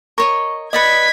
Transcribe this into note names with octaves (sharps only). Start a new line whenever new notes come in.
A#4 C#5 D#5 C#6
B4 D5 D#5 D#6 G#6 B6 C#7